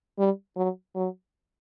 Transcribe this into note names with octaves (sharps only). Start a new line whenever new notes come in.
G3
F#3
F#3